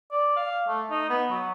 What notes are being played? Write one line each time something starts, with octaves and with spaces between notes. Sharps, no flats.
D5
F5
A3
D#4
B3
F#3